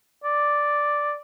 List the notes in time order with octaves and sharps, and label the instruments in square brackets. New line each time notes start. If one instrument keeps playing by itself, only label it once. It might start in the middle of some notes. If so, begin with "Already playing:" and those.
[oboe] D5